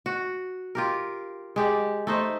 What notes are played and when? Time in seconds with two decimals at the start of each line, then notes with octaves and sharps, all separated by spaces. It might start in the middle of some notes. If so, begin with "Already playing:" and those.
0.06 F#4
0.75 F4 G4 A#4
1.56 G#3 G4 D5
2.07 A3 D#4 C5